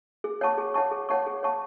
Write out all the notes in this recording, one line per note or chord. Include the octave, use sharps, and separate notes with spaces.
G#4
C#5 F#5 A5 C#6
G#4
C#5 F#5 A5 C#6
G#4
C#5 F#5 A5 C#6
G#4
C#5 F#5 A5 C#6